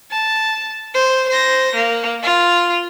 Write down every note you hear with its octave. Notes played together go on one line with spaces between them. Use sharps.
A5
C5
C5 A#6
A#3
F4